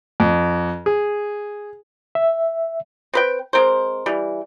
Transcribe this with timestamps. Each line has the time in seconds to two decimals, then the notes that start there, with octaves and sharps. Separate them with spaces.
0.20 F2
0.86 G#4
2.15 E5
3.14 C4 B4 G5
3.53 G#3 C4 A#4 C5
4.06 E3 G3